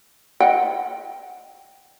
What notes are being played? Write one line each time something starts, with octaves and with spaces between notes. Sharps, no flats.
D#5 F#5 G5